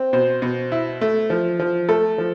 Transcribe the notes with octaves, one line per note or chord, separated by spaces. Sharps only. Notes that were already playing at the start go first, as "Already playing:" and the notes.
Already playing: C4
B2 C5
B2
E4
A3
F3
F3
A3 A4
F3